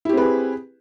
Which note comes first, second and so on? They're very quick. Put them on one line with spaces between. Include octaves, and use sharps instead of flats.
E4 G4 C4 B4 G#4